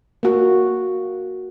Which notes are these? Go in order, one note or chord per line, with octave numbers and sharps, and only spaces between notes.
A#3 F#4